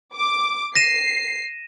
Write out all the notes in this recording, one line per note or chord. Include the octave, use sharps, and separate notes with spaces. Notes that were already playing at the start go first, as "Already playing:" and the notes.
D6
A#6 C7 D#7 E7